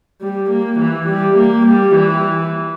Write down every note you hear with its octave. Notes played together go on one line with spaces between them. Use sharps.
G3
A#3
E3
G3
A#3
G3
E3